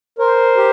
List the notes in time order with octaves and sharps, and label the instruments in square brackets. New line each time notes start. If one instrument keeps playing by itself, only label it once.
[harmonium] A#4 [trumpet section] C5
[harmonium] G4